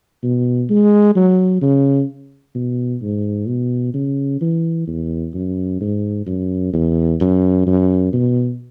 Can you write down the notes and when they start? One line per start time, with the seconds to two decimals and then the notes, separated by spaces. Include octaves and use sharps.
0.23 B2
0.70 G#3
1.16 F#3
1.62 C#3
2.55 B2
3.02 G#2
3.48 B2
3.94 C#3
4.41 E3
4.87 E2
5.34 F#2
5.81 G#2
6.26 F#2
6.74 E2
7.20 F#2
7.66 F#2
8.13 B2